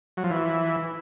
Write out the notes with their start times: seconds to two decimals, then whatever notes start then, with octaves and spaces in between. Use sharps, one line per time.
0.17 F#3
0.24 F3
0.31 E3